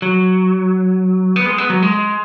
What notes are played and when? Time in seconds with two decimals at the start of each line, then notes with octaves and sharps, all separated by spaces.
0.02 F#3
1.36 B3
1.46 G#3
1.58 B3
1.70 F#3
1.82 G#3